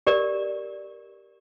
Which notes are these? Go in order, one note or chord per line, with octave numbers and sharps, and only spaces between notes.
G4 A#4 D5